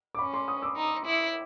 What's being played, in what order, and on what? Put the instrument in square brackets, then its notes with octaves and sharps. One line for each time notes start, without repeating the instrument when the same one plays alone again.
[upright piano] D6
[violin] C#4 [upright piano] B5 C#6
[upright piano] C6 D6
C#6 D#6
D6 E6
[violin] D#4
E4